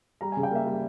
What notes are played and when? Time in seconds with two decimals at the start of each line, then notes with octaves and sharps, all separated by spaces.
0.21 G3 A#5
0.32 G#5
0.37 C#3
0.43 G5
0.51 A#3 E5
0.66 G3